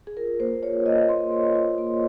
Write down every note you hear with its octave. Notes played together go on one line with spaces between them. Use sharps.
G#4
F4 A#4
A#3 C5
F4 C#5
A#3 D#5
F4 C6
A#3
F4
A#3